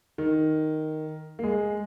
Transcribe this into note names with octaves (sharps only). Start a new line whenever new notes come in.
D#3
A#3
G#3